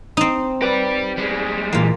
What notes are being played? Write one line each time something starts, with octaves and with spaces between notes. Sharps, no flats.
C4 D#4
G4 B4 D5
G3 G#3
A#2 E3 A#3 F4